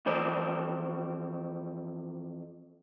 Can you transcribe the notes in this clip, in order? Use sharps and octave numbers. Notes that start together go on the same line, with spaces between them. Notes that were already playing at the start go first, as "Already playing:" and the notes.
F2 E3 C5 D5